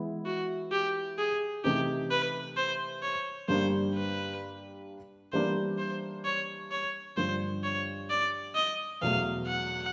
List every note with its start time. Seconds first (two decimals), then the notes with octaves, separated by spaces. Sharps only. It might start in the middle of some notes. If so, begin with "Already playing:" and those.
Already playing: E3 G#3 B3 E4
0.26 F#4
0.72 G4
1.18 G#4
1.64 C3 E3 A3 C4 D#4 G4
2.10 B4
2.57 C5
3.02 C#5
3.48 G2 D3 G3 A#3 D4 C5
3.94 B4
5.33 E3 G3 A#3 D4 C5
5.78 C5
6.25 C#5
6.71 C#5
7.17 G2 D3 F3 C5
7.63 C#5
8.10 D5
8.55 D#5
9.01 E2 B2 F#3 A3 F5
9.47 F#5